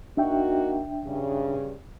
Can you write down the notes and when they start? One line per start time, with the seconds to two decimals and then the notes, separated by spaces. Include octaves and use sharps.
0.17 A#3 D4 D#4 F#4 E5 G5
1.04 G2 C#3